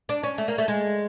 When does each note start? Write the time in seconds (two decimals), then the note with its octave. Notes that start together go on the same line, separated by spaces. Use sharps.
0.09 D4
0.23 C#4
0.38 A3
0.48 A#3
0.58 A3
0.68 G#3